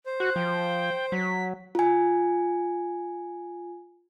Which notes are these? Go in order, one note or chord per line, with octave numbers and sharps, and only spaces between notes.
C5
F#4 F#6
F3 G5
F#3 B6
F4 G#5